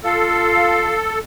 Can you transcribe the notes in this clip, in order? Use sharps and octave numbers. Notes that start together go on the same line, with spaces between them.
F4 A4 F5